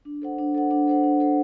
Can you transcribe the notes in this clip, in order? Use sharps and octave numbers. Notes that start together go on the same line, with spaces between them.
D4
A4 C5 F#5
D4
A4 C5 F#5
D4
A4 C5 F#5
D4
A4 C5 F#5